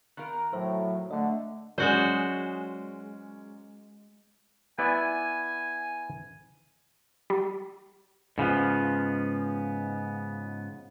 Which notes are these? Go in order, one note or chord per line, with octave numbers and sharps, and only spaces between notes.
D#3 A#4 F5 B5 F#6
A2 F#3 C5 E5
D3 A3 D#5 F#5
F#3 G#3 C#4 F#4 C5 D5
B3 E4 D5 G#5
G3
G#2 C#3 F3 B3